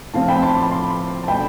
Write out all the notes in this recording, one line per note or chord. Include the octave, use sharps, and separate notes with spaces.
A2 F3 C4 F5 A5
G5 B5
A5 C6
B5 D6
A5 C6
A5
B2 A3 D4 G5 B5